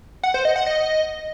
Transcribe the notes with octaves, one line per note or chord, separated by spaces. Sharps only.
F#5
C5
D#5
F#5
D#5